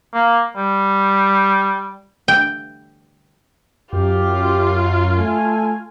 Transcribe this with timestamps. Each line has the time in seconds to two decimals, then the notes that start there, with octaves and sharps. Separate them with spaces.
0.14 A#3
0.57 G3
2.28 G5
3.93 F#2 F4 G4
5.19 A3 G#5